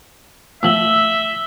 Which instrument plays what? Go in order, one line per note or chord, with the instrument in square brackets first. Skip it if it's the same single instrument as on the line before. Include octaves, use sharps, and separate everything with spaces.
[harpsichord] A2 F3 [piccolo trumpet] E5 [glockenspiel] E6 F#7 G7